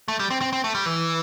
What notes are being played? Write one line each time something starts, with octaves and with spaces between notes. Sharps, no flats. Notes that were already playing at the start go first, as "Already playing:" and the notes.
A3
G3
C4
C4
C4
A3
G3
E3